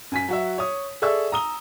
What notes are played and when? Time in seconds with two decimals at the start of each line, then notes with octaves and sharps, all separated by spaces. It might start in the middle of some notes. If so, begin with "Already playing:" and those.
0.12 F#2 G#5 B6
0.28 F#3 F#4 E5
0.58 C#5 D#6
1.02 G#4 A4 D5 E5 C#6 E6
1.32 A#5 D#6 G7